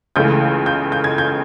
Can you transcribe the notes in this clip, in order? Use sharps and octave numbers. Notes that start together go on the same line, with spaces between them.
C#2 C#3 E3 A3 G6
G6
G6
G#6
G6